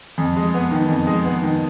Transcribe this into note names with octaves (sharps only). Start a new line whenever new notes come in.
F2
G#3
B3
D#3
F2
G#3
B3
D#3